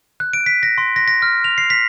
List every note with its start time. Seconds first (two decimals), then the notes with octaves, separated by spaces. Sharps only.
0.20 F#6
0.33 D7
0.46 B6
0.63 A#6
0.78 C6
0.96 A#6
1.08 A#6
1.22 F6
1.44 F7
1.58 C7
1.70 B6